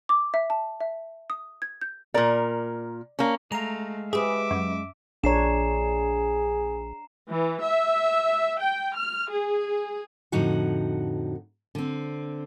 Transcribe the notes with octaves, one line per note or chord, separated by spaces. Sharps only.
D6
E5
A5
E5
D#6
G#6
G6
A#2 A#4 D5
A#3 C#4
G#3 A3 F5 A#5
G4 G#4 B4 E5 D6
F#2
A#1 D4 G#4 C#5 A#5 C7 E7
E3
E5
G5
F6
G#4
F2 A2 D3 D#4 F#4 F#5
D3 C4